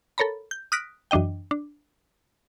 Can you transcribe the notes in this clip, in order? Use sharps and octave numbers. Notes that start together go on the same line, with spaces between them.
A4 A#4 C#5 A#5 B5
G6
D#6 F6 F#6 A#6 B6 D7
F#2 E3 D4 D#5 G5
D4